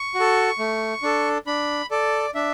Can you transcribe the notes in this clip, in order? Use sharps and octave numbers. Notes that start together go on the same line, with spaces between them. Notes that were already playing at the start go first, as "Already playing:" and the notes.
Already playing: C#6
F#4
A4
A3
D4 A4
D4 B5
A4 D5
D4 E5